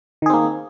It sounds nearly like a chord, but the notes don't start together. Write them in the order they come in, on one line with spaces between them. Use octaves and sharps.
D#3 G#4 C4 A#3